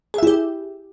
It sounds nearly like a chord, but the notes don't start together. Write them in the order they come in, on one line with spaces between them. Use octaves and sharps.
G#4 E5 E4 G4